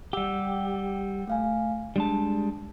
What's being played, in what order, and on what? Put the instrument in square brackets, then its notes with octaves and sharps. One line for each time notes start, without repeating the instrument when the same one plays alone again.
[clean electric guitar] G3 G4 [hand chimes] F#5 G5 E6
[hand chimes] A3 F5 G#5
[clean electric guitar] G3 G#3 A5 [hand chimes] D4